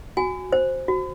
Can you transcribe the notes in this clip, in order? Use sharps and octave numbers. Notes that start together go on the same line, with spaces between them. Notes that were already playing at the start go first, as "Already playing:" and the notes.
F#4 G#5
C5
F#4